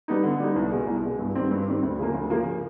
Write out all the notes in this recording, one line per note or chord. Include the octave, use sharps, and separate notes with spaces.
G3 B3 D#4
D3
G3 B3 D#4
C2
B2 G#3
C2
B2 G#3
G2
D#3 G3 C4
G2
D#3 G3 C4
D2
C#3 F3 A#3
D2
C#3 F3 A#3